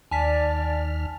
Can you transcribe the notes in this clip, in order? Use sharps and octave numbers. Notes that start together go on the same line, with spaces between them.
D#2 D5 G#5 A5 F6 B6